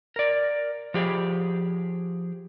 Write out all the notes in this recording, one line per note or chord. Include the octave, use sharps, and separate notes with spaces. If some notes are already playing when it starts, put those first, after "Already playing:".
A#4 D5
F3 G4 G#4